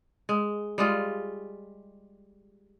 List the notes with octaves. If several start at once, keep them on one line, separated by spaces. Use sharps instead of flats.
G#3
G3 G#3 F4